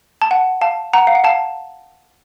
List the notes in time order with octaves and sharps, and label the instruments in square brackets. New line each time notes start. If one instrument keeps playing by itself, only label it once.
[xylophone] A5
F#5
F5 A5
F#5 A#5
F5
F#5
F5 A5